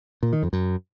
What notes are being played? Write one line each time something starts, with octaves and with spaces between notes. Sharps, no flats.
A#2
D#3
F2
F#2